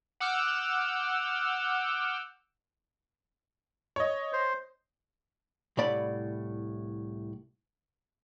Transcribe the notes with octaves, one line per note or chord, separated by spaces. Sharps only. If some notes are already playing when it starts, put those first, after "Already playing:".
F#5 D6 E6 F6 G6
C#5 D#5
C5
C2 A2 D5 B5